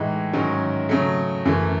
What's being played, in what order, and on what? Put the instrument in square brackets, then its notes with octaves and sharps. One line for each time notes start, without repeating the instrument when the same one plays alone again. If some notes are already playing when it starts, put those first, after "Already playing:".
Already playing: [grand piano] A2 E3 G#3 D#4
G#2 D#3 F#3 C#4
C#3 F#3 A3
F#2 E3 A3